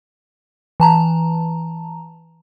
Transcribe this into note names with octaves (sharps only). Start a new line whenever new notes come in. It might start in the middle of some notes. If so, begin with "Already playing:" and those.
E3 A5 A#5